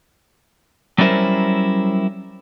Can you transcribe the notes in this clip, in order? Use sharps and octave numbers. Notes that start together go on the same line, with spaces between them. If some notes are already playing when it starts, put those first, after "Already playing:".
F#3 G3 C#4 E4 A#4 C5